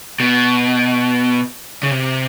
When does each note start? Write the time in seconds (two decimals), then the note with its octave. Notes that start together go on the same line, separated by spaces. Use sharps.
0.20 B2
1.83 C#3
1.91 C3